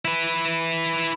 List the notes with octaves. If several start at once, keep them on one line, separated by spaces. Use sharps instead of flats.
E4 B4